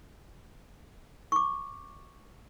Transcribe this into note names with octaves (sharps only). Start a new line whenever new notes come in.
C#6 D6